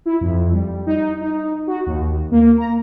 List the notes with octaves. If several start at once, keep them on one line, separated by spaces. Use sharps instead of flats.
E4
F2
G3
D#4
D#4
F#4
D#2
A#3
A#5